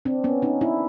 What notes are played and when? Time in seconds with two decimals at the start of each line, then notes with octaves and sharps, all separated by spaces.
0.05 C4 D4
0.24 B3 C#4
0.42 C#4 D#4
0.61 D4 E4